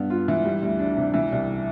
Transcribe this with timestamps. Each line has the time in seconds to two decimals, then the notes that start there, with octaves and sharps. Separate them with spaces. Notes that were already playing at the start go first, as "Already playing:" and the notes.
Already playing: G2 B3
0.10 F4
0.28 E3
0.45 G3
0.62 D2
0.79 D4
0.96 C3
1.14 E3
1.32 C2